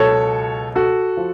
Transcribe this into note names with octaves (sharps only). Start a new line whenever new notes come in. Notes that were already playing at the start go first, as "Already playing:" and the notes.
Already playing: C#2 B2 F#3 A4 C#5
F#4 A4
F3